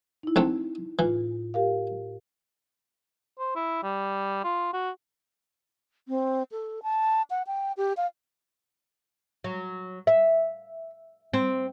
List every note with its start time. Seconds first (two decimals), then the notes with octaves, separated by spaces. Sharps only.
0.23 D#4 E4
0.36 A#1 A3 C4
0.99 A2 E3 F4
1.54 G4 A#4 F5
3.39 C5
3.56 E4
3.83 G3
4.44 F4
4.73 F#4
6.08 C4
6.52 A4
6.83 A5
7.30 F#5
7.47 G5
7.77 G4
7.97 F5
9.44 F#3
10.07 E5
11.33 C4